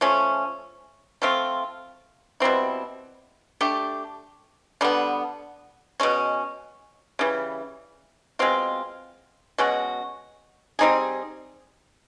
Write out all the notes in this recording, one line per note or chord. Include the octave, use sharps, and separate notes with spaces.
F3 A3 C#4
F3 A3 C4 F4
B2 G3 C4 E4
A3 D4 G4
D3 G3 B3
B2 G#3 C#4
C#3 E3 G3
B2 G#3 C4 F4
B2 G#3 C#4 F#4
G3 C4 D#4 G#4